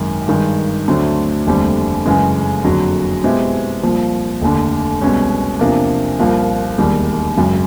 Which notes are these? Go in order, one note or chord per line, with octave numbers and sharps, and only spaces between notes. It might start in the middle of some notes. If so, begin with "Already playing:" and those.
Already playing: G#1 F#2 D#3
G2 D#3 G#3
D2 D3 F#3 A3 C4
F1 D#2 D3 G3 C4
F#2 C#3 E3 G#3
F#1 F2 D3 F#3
B2 G#3 C4 E4 G4
C2 A#2 F3
F1 D#2 D3
C2 B2 G#3 C#4
E2 C3 F3 A#3 D4
C2 A#2 F3 A#3
E1 D#2 D#3 G3
G#1 F#2 C#3 F#3